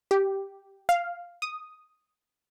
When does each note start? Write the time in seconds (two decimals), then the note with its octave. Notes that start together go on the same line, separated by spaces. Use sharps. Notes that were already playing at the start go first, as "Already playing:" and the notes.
0.11 G4
0.89 F5
1.42 D#6